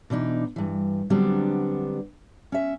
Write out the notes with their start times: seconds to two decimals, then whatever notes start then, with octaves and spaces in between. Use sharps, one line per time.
0.10 B2 E3 D4 D#4
0.56 G2 E3
1.10 D3 F#3 G3 B3 C4 D4
2.52 C#4 E5